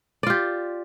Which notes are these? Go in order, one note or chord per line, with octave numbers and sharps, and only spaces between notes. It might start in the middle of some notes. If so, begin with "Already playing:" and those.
F4 G4 D5